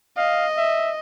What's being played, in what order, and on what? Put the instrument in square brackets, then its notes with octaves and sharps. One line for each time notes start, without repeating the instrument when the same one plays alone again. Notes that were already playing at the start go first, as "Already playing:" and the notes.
[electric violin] D#5 [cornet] F5
[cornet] E5